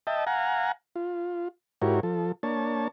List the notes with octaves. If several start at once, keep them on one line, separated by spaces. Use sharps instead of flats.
D#5 E5 G5 A5
F5 F#5 G#5 A#5
F4
G#2 E4 F#4 G4 A#4 C#5
F3 A4
A#3 D4 C#5 A5